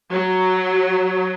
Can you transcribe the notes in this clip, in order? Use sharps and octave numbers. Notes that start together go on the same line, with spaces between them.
F#3